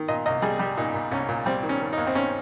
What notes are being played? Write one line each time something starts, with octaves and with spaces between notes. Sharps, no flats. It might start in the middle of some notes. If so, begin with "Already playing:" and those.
Already playing: D#3
A#2 D#5
C2 D#5
G3 G#4
G3 G4
A#2 D#4
A#2
C2 C#4
A#2
G3 C4
D#3
C#4
D#3
D#4
D#2
C4
D#2 C#4